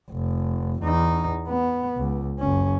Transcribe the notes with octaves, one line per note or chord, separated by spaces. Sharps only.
F1
E2 D#4
B3
C#2
F#1 C#4